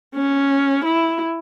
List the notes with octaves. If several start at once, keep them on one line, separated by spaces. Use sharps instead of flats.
C#4
E4